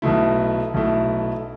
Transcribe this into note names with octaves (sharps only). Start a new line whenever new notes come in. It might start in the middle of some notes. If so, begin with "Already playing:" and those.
B1 B2 A3 E4
B1 B2 A3 E4